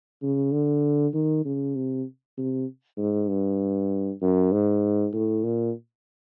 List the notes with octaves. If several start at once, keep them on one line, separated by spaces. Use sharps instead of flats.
C#3
D3
D#3
C#3
C3
C3
G#2
G2
F#2
G#2
A2
A#2